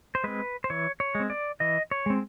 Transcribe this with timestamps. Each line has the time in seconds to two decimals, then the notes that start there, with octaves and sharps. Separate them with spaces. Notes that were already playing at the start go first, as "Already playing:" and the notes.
0.15 C5
0.24 G#3 C4 B4
0.64 C5
0.70 E3 C#5
1.00 C#5
1.15 G#3
1.20 C4
1.30 D5
1.60 E3 D#5
1.91 C#5
2.06 G#3 C4